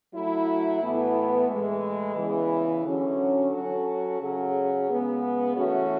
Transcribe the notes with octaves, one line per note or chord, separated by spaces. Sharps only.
F#3 A3 E4
A2 E3 B3
A2 E3 G#3
E2 C#3 E3
D3 F#3 C#4 F#4
F#3 C#4 F#4 A4
C#3 F#3 C#4 G#4
C#3 G#3 B3
E3 A3 C#4 F#4